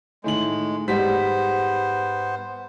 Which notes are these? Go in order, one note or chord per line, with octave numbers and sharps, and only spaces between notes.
A2 D#3 G#3 F#7
G#2 G3 B3 C5 B6